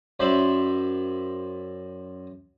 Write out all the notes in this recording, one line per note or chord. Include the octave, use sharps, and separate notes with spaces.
F#2 C5 D5 E5 B5